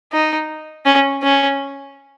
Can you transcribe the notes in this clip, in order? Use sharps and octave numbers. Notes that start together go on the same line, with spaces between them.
D#4
C#4
C#4